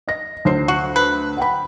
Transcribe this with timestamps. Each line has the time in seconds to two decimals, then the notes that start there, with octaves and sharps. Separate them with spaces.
0.08 D#5 A#6
0.45 D2 C5 C7
0.68 F#4
0.96 B4
1.37 F#5 G5 B5